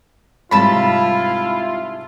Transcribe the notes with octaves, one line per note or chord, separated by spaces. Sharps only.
G#2 C3 G3 E4 F4 A5 B5